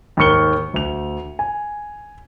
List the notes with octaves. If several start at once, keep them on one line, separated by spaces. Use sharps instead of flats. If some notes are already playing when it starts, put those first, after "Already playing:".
D#2 G#2 A#4 C#6 C#7 G7
D2 F7
G#5